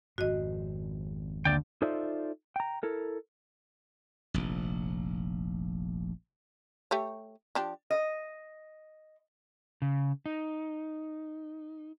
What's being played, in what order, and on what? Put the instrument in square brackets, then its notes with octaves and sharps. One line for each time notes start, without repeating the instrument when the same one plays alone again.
[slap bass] G#1 F2 G#2 [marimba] F#4 D#5
[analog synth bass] D2 [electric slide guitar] A#3 D5 G5
[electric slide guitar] D#4 F4 A4 C5 D5 E5
G5 A#5
E4 A4 A#4
[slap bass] F1 A#1
[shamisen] A3 G4 C#5
F3 D4 G4
[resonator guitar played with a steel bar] D#5
[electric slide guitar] C#3
D#4